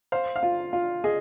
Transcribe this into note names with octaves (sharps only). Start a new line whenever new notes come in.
C5 F5
F5
F4
F4
G#4 D#5